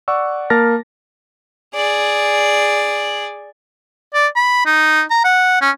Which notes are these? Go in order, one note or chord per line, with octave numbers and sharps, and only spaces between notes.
D5 F#5 C#6 E6
A#3 A#4 A5 F6 A6 A#6
G#4 D5
D5
B5
D#4
A#5
F#5
C#4